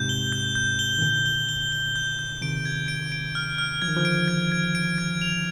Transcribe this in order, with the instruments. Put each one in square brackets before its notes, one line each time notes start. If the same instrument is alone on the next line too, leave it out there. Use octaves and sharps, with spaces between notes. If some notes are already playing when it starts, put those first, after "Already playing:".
Already playing: [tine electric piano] G#2 C3 [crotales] G6
[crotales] G7
G6
G6
G7
[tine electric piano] D#3
[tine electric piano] A#2 D3 [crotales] G7
[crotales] G7
G7
G7
G6
G6
[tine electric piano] C3 D#3 [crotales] D7
[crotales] G#6
D7
D7
F6
F6
[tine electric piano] F3 [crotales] G#6
[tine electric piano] D#3
D3 F3
[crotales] D7
G#6
G#6
D7
G#6
F7